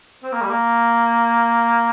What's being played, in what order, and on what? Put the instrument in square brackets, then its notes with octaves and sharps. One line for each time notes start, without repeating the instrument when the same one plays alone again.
[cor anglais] C4
A#3
G3
A#3